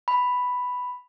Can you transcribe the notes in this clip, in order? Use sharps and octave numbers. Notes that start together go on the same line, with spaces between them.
B5